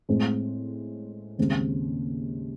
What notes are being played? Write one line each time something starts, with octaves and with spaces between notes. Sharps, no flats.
A2 G#3 C4
D#2 C#3 G#3 C4